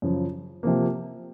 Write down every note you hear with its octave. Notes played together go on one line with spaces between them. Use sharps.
F#2 C#3 F3
C3 F3 A#3